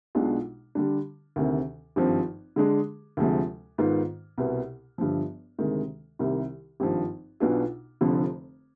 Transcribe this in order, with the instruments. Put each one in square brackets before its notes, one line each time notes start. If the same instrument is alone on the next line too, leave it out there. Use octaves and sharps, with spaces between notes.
[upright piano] B1 B2 G#3 D4 F4
D3 G3 D4
D2 C3 D#3
G#1 G2 F3 C4
D3 G#3 D4 G#4
D2 C3 F3 G#3
G#2 D#3 B3 F4
C2 B2 B3
G1 G2 F3
D2 C3 D#3 G#3
C2 C3 D#3 G3
G#1 G2 F3
B1 B2 B3 D4 F4
F1 F2 D3 F3